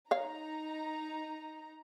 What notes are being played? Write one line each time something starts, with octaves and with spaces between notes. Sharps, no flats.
D#4 C#5 F5 A#5